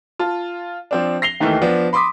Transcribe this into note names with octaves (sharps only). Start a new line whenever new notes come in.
F4 A5
F3 C4 D4
A#6 C7 F7 G7
D#2 D#3 E3 A3
F3 B3 D4
B5 C6 D6 D#6 B6